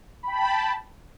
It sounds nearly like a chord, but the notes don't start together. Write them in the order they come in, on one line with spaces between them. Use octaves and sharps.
B5 G5 A5